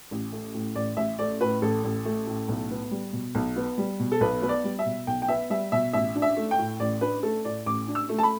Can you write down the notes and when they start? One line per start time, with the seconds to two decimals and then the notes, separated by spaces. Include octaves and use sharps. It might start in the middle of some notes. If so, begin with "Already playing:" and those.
0.11 A1
0.32 A3
0.54 A2
0.75 A1 D5
0.97 A1 E5
1.19 A3 D5
1.40 A2 B4
1.62 A1 A4
1.84 A1
2.05 A3
2.27 A2
2.48 B1
2.70 B3
2.91 G3
3.13 B2
3.35 B1
3.56 B3
3.78 G3
3.99 B2
4.12 A4
4.21 B1 B4
4.42 B3 B4
4.49 D5
4.64 G3
4.79 E5
4.85 B2
5.07 B1 G5
5.22 G5
5.28 B3 E5
5.50 G3 E5
5.72 B2 E5
5.93 A1 E5
6.15 D4
6.22 E5
6.37 A3
6.51 G5
6.58 A2
6.80 A1 D5
7.01 D4 B4
7.23 A3 A4
7.45 A2 D5
7.66 A1 D6
7.88 D4
7.95 E6
8.09 A3
8.19 A5
8.23 B5